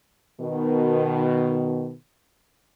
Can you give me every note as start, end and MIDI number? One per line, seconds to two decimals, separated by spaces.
0.41 1.93 47
0.41 1.93 51